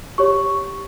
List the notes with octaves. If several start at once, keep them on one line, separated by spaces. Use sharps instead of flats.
G4 C#5 C#6